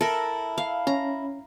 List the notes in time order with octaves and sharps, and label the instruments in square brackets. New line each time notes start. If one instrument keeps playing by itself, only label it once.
[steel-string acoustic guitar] E4 [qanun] A4 A#4 [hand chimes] A5
[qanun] F5
[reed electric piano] C#4 [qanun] A#5